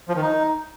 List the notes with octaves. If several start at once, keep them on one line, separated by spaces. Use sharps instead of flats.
F3
D#3
D#4